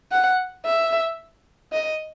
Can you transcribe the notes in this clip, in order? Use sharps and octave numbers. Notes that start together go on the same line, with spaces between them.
F#5
E5
D#5